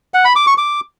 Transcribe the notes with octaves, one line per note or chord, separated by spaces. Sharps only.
F#5
B5
D6
C#6
D6